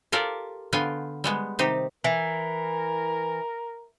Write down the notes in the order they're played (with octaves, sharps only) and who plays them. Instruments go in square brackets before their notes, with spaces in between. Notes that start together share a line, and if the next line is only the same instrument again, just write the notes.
[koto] F4 G4 A4 A#4 D5
D3 B3 F4 G5 G#5
G3 G#3 B3
C3 D#3 C4 D#4 G4
[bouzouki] E3 [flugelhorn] A#4